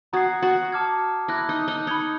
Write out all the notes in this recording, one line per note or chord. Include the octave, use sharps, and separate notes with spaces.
F#4 A#5 D#6 G#6 C7
F#4
A5 D6 F6 G#6 C#7
E4 A#5 D6 F#6 A#6
D#4
D#4
D#4 B5 D#6 G#6 C#7